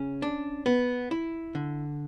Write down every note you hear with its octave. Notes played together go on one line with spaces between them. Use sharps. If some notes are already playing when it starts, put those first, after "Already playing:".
Already playing: C#3 C#4
D4
B3
E4
D3